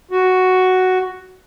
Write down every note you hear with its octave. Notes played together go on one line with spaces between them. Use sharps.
F#4